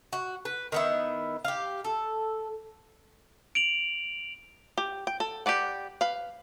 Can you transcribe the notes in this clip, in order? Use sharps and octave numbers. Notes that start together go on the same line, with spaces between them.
F#4
B4
D#3 B3 E4
G4 F5
A4
D7 F7 F#7
G4
G5
A4
G4 B4 D5 F#5
B4 F5